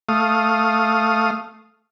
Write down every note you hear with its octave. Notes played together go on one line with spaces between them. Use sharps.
A3 F5 D#6